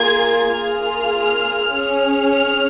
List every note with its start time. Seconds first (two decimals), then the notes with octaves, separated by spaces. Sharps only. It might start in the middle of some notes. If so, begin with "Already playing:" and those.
Already playing: A#3 F4 G#4 G#6
0.52 A#3 F4 G#4 F6
1.73 C#4 G#4
2.33 F6